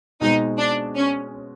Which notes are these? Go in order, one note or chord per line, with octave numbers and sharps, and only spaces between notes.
B2 G#3 C4 D#4
D4
C#4